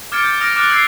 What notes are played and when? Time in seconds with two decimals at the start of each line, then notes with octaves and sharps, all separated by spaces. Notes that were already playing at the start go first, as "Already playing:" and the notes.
0.12 D6 F6 G#6 A6 C#7 D7
0.24 G6
0.41 D#6 F6 A#6 D7
0.56 D6 F6 F#6 A6 D7
0.70 E6 F#6 G#6 C7 D7